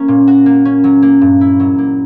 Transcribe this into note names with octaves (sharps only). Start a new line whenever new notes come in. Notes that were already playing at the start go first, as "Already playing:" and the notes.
Already playing: A#3 C#4
A#2
F#4
A#3
C#4
F#3
A#3
G2
E4
F#3
A#3